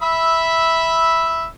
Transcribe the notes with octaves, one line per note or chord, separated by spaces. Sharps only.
E5 B5 E6